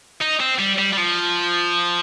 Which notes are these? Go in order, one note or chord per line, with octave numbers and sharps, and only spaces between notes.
D#4
C4
G3
G3
G3
F3